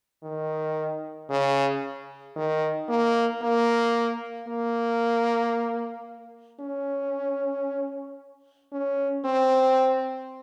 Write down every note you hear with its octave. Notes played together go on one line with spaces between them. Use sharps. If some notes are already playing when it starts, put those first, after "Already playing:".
D#3
C#3
D#3
A#3
A#3
A#3
C#4
C#4
C4